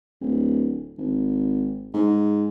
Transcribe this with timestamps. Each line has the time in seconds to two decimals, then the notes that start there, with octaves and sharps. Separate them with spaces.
0.21 D1
0.98 G#1
1.94 G#2